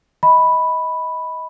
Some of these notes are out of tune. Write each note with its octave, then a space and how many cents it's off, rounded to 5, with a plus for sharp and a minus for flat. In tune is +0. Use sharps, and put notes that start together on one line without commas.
D#5 +25 B5 +0